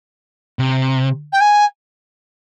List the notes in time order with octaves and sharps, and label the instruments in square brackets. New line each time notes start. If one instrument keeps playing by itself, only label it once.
[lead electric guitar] C3
[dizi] G5
G#5